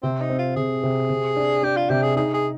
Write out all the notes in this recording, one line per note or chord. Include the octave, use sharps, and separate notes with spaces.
C3 C4
D#4
C4
F4
C3 G#4
C3
C3
D4
D4 G4
F4
C3 G4
G#4
D#4 G#4
G#4